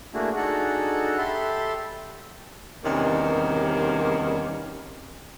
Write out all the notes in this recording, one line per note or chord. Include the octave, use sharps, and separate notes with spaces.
A3 A#3 D4 E4 F#4 G#4
D4 D#4 F#4 G#4 A4 F#5
G4 A4 E5 B5 C6
E2 C3 D#3 G3 A#3 C#4